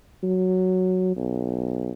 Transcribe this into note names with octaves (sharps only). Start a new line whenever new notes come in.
F#3
B1